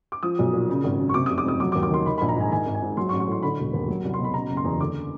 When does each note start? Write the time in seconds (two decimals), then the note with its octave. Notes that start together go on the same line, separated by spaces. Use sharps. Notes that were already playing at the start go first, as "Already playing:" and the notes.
0.12 D6
0.23 F3 D#6
0.39 B1
0.53 A#2
0.69 C#3
0.84 G#1
0.99 F#2
1.09 C#6
1.14 C3 D6
1.26 F1 D#6
1.38 D6
1.45 F2 D#6
1.60 F#3 D6
1.72 D6
1.75 D#2
1.83 D6
1.91 D#3 C6
2.06 D#3 B5
2.18 A#1 B5
2.29 A#5
2.36 G#2 G#5
2.51 D#3 G#5
2.66 G#1
2.75 G#5
2.82 G#2
2.97 F#3 C6
3.09 C#6
3.12 A1
3.20 C#6
3.27 A2 C6
3.43 D3 B5
3.59 E1
3.73 D#2
3.88 F#3
4.04 C2
4.14 C6
4.20 B2 B5
4.34 C#3 A#5
4.50 F#1
4.57 C6
4.64 E2
4.80 D3 D6